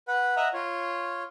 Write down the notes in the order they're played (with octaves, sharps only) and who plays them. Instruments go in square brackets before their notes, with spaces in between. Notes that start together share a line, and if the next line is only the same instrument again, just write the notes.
[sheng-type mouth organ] B4 F#5
D#5 E5 F#5 A#5
F4 C#5